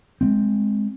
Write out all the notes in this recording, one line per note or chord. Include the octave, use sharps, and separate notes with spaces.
G#3 A3 C4